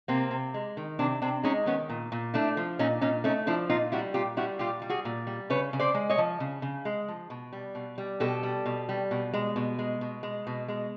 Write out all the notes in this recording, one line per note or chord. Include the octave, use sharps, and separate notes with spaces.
C3 A#3 C4
C3
G#3
D#3
C3 C4 D4
C3 C4 D4
G#3 C#4 D#4
D#3 B3 C#4
A#2
A#2
A3 D4 E4
F3
A#2 C#4 D#4
A#2 C#4 D#4
A3 C#4 D#4
F3 D4 E4
A#2 D#4 F4
G3 E4 F#4
A#2 F4 G4
G3 E4 F#4
A#2 F4 G4
G3
F#4 G#4
A#2
G3
C#3 B4 C#5
C#3
C5 D5
G#3
C#5 D#5
F3
C#3
C#3
G#3
F3
B2
G3
B2
G3
B2 G4 A4
G3
B2
G3
B2
G#3
B2
G#3
B2
G#3
B2
G#3